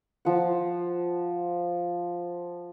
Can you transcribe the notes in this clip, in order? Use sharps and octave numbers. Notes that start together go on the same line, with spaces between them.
F3 F#5